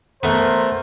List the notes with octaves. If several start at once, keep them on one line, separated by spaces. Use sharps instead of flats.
A3 B3 A#4 C5